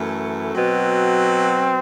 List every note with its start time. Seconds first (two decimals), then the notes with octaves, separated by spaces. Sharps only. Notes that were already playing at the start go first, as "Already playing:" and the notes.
Already playing: F#2 E3 A3
0.53 B2 F#3 C4